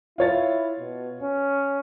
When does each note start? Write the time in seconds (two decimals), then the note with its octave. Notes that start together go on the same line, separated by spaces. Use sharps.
0.18 E4 F4 C#5 A6
0.79 B2
1.22 C#4